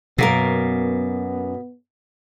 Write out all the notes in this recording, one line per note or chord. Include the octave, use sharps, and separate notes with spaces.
F#2 B2 A#3 B3 A#4